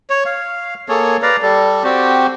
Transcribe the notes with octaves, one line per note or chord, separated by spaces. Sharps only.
C#5
F5
A#3 G#4 A4 C#5
B4 D5 F5 A#5
G3 A4
C4 F#4 G4